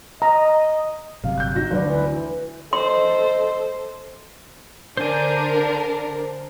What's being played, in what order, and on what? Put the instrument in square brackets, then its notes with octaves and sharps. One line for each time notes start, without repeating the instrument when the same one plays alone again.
[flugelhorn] D#5 [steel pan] A#5
[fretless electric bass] G1 C3 F#3 [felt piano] F5
[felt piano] F#6 G6
D#4 F#4 A#6
[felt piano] D2 B4 D5 [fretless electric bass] F#3
[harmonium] E3 [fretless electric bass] D4
[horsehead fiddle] A4 C5 [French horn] D#5 [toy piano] C6
[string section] D3 D4 A#4 [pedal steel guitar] C5 G#5